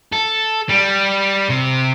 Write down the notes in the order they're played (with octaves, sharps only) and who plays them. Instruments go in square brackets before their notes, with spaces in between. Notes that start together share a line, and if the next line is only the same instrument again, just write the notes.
[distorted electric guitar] A4
G3
C3